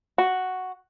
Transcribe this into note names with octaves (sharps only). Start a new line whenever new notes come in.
F#4